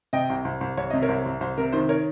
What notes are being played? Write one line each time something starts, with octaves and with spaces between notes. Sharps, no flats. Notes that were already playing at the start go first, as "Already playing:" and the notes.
C3 D#5 G5
C2
C2
C2
C2 C#5
C3 D#5
A#4 C#5
C2
C2
C2 C5
C3 A#4
D#3 C5
A#4 C#5